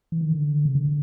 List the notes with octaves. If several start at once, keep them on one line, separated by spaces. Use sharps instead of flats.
E3
D#3
D3
C#3
D3